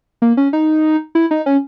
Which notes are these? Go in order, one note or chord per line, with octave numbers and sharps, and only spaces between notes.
A#3
C#4
D#4
E4
D#4
C#4